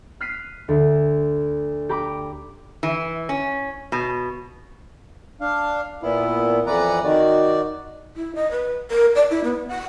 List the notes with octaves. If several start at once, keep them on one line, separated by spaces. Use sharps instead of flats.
F6 F#6 B6 C7 D#7
D2
G4 A#5 B5 D6
E3
C#4
B2
D4 F5
A#2 B3 E4
F2 E3 B4 D5 F#5 A#5
D#3 F#4 D5
E4
D#5
B4
A#4
D5
E4
B3
F#5